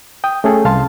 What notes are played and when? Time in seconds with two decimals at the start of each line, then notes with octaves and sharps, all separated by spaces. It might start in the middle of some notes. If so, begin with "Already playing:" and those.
0.24 G5 D#6
0.44 A3 C#4 G#4 A4
0.65 C2 F5 A5 C6